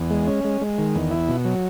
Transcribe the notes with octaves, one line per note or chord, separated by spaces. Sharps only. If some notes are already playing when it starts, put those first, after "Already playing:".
Already playing: E2
G#3
C#4
G#3
G#3
D#3
E2
E4
B2
F#3